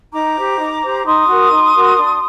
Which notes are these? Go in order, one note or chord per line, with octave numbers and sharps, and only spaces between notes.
D#4 A#5 D6
G4 C5
D#4
G4 C5
D#4 C6 D#6
F#4 A#4
D#4
F#4 A#4
D4